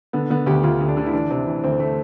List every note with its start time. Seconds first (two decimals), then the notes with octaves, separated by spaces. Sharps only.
0.13 D3 B3
0.30 D3 B3
0.46 D2 G4
0.63 D2 F4
0.80 D2
0.88 D4
0.97 D3
1.06 E4
1.13 E3 D4
1.31 C3
1.46 E3
1.64 D2 C4
1.80 A3